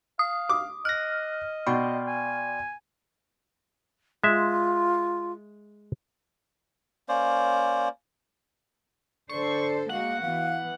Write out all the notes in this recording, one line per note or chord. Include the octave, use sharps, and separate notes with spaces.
F5 D#6
D6
D#5 F6 F#6 A#6
B2 D5 G5 C6
G#5
G#3 F4 E5
A#3 C#4 C5 D5
D3 A4 C5 D5 C#6
G#3 A#3 F#4 F5 F#5
E3 B3 F5